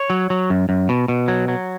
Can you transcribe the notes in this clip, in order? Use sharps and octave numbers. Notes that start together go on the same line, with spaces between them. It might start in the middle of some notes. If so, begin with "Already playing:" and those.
Already playing: C#5
F#3
F#3
F#2
F#2
B2
B2
F#3
F#3